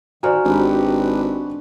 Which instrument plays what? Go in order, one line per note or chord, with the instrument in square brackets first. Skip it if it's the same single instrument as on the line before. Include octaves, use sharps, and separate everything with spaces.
[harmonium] D#3 [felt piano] F#4 C5 D5 [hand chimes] G#5 A#5 F6
[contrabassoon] G#1 [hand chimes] D4 [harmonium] G4 B4